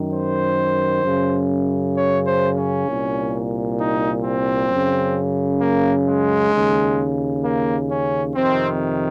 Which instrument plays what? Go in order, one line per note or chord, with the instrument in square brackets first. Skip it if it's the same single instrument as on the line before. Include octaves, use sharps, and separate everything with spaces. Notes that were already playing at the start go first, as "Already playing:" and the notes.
Already playing: [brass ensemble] F#2 D#3
C5
F#2 C#3
C#5
C5
C#4
C2 A#2
D#4
C4
F#2 C#3
A#3
G#3
D#2 C#3
A#3
C#4
F2 C3 D#3 C4